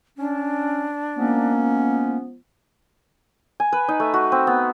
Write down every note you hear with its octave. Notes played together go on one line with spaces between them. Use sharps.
C#4 D4
F3 G#3 A#3 B3 C#4
G#5
B4
D#4
A3
F#4
C4
B3